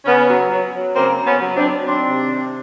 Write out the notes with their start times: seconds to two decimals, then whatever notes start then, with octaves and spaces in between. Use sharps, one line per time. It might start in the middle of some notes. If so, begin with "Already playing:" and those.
0.05 C#3 B3 C#4
0.28 F#3
0.52 F#3
0.74 F#3
0.96 C#3 A#3 C4
1.18 C#3
1.26 B3 C#4
1.41 F#3
1.57 C4 D4
1.64 F#3
1.87 D#3 C4 D4
2.09 C3
2.32 C3